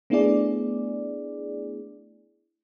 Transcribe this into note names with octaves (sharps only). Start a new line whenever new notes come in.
A3 B3 D4 E4 G#4 D5